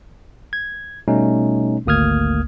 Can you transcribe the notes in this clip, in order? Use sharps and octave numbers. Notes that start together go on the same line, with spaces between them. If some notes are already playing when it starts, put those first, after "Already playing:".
G#6
B2 G3 A3 C#4 D#4
G#1 D2 A#3 D#6 F6 G#6